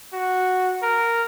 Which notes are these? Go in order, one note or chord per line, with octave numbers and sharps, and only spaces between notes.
F#4
A#4